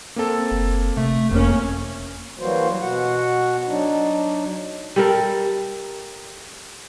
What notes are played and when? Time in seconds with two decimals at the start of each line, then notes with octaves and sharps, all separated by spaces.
0.16 A#3 C4 A4
0.51 F#1
0.97 C3 A3
1.31 F#1 F2 A#3 C#4
2.39 E3 F#3 G3 A#3 F#4 C5
2.81 B2 F#4 F#5
3.68 F#3 D4 D#4
4.96 G3 A4 A#4